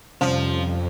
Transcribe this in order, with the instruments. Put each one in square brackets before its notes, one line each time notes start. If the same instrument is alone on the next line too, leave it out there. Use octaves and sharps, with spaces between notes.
[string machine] F2 [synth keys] C3 G3 [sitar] F3 [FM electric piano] C#4